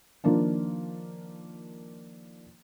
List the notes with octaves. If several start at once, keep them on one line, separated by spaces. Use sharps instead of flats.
D#3 F3 A#3 D4 F4